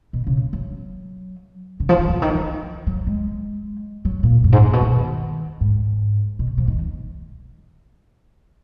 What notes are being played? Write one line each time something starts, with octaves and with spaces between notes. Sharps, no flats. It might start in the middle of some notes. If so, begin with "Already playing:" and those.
B2
C#3
F#3
C#3
F3
D#3
C#3
D#3
F3
F#3
G#3
F#3
A#2
F#2
G#2
A#2
B2
D#3
G#2
B2
F3
D#3